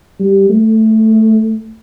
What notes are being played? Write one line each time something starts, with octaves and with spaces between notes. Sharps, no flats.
G3
A3